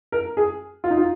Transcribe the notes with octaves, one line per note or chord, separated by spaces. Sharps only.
A#4
G#4
F4
D#4
F4